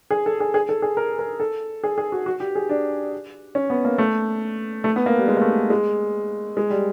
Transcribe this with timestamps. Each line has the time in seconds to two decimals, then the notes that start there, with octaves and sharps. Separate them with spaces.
0.11 G#4
0.26 A4
0.40 G#4
0.54 G#4
0.69 A4
0.82 G#4
0.97 A#4
1.19 A#4
1.40 A4
1.84 G#4
1.98 G#4
2.12 F#4
2.26 F#4
2.40 G4
2.55 G#4
2.69 D4
3.55 C#4
3.70 B3
3.85 A#3
3.98 A3
4.84 A3
4.96 B3
5.06 A#3
5.18 G3
5.28 G#3
5.37 A#3
5.41 A3
5.70 G#3
6.57 G#3
6.70 G3